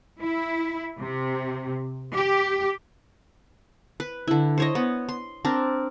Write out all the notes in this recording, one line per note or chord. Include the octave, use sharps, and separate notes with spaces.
E4
C3
G4
B4
D3 E4
C5 C#5 D#5
B3
C6
C4 D4 A#4